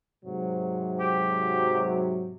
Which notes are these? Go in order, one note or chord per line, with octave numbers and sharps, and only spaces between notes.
G#2 C3 F#3
G4